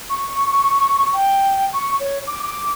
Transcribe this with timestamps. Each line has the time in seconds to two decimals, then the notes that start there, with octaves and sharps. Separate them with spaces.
0.10 C#6
1.13 G5
1.73 C#6
2.00 C#5
2.27 D6
2.43 D6